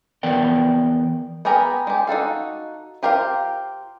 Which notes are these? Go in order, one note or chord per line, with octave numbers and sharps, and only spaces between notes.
E3 B3 A#4 D5 G5
B3 G4 G#4 A#4 A#5
G#3 G4
D#4 F#4 A4 F5
F4 G4 A#4 C5 F5